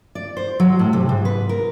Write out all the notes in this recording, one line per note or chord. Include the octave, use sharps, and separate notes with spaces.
D5
C5
F#3
A2
C3
G#2
B4
A#4